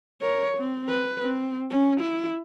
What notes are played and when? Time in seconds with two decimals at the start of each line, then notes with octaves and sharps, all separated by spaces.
0.22 A#4 C#5
0.58 C4
0.89 B4
1.21 C4
1.70 C#4
2.00 E4